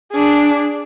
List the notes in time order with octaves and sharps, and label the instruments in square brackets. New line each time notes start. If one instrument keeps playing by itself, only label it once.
[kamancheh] D4 G#4